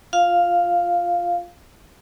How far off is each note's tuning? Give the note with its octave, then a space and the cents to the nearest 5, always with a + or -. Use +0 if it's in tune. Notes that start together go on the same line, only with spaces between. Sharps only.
F4 +0 F5 +0